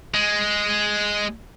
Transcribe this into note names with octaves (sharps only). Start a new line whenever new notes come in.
G#3